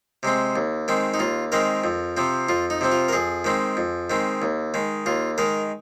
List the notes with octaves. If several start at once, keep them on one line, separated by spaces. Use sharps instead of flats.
C3 G#3 C4
D#2
D#3 G#3 C4
D#4
D#2 F4
D#3 G#3 C4 A#4
F2
C3 F3 C4
F2 F4
D#4
C3 F3 C4
F4
A#4
F2 G#4
D#3 G#3 C4
F2
D#3 G#3 C4
D#2
D#3 G#3
D#2 F4
D#3 G#3 A#4